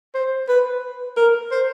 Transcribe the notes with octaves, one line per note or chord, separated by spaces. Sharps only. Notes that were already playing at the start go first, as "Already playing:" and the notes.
C5
B4
A#4
C5